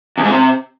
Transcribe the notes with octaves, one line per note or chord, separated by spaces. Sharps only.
E2
G#2
C3